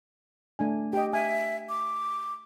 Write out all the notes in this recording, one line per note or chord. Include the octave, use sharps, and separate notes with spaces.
A3 D4 G#5
G4 D#5 G5
E5 G#5
D6